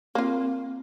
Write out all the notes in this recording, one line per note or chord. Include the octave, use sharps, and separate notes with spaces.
A#3 C4 F4